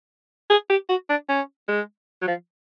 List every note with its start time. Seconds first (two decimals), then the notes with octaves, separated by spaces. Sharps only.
0.50 G#4
0.70 G4
0.89 F#4
1.09 D4
1.29 C#4
1.68 G#3
2.22 F#3
2.27 F3